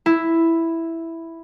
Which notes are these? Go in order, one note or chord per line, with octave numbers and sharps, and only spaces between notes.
E4